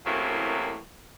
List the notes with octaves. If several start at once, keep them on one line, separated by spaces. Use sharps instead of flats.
F#2 A2 C3 E3 F#3 A#3